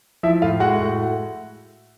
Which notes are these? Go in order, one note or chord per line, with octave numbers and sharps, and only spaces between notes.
F3 E4 E5
A2 F4 F5
G#3 F#4 F#5
A2